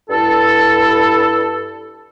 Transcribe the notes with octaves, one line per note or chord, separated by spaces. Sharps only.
G2 E4 A4